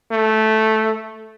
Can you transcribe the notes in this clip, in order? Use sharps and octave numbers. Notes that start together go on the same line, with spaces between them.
A3